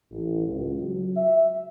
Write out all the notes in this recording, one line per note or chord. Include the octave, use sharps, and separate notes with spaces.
A1
C#2
F#3
E5